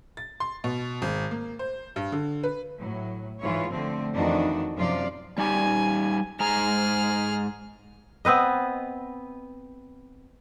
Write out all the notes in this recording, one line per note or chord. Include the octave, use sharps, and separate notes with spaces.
A6
C6
B2
G#1
A#3
C5
G2
D3
B4
A2 F#3
G#2 E3 F4 C#5
D3 F3 A3 C4
F2 D#3 E3 D4 D#4 F#4
F#2 C3 F3 F4 D5 F5
G3 D#4 G4 G#5
G#2 G#4 A#5 F6
B3 C4 B4 D#5